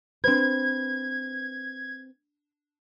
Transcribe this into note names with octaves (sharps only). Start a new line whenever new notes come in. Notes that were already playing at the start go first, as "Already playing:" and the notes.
C4 D4 B4 C5 G#6